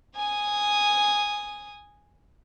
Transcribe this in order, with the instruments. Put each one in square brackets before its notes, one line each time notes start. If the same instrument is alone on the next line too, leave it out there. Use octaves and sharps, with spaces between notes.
[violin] G#5 D#6